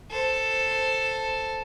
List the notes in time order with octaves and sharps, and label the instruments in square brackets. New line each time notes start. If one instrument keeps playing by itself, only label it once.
[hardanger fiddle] A4 C5